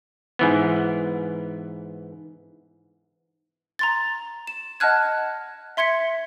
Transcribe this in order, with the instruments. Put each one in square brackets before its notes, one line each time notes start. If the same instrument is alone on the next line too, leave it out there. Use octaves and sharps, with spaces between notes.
[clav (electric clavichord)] G#2 E3 B3
[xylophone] A#5 C6 A6
E7
D#5 F#5 A5 F6 F#6 G#6
E5 C6 G#6 B6 C#7